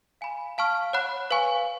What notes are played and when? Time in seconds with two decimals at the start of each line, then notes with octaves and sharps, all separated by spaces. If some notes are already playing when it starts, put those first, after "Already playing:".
0.21 F5 G#5 B5
0.58 F5 A5 C#6 F6
0.93 C#5 F#5 B5 F#6
1.31 B4 F5 G#5 C#6